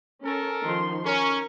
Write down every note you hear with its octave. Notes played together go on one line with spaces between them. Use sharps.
C#4 A4 A#4
D#3 F3 C6
C#4 A#4